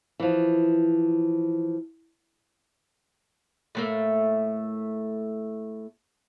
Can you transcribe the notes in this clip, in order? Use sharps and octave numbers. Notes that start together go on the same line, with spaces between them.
E3 F3
A2 A3 A#3